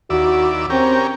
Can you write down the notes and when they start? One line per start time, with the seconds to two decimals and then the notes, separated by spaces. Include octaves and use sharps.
0.10 D#2 E4 F#4 D5
0.70 C4 C#4 G4 A#4